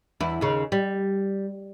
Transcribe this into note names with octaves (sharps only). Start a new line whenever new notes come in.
E2 E4
D#2 C#3
G3